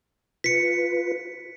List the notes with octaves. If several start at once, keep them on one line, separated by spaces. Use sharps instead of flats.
F4 B4 B6 C#7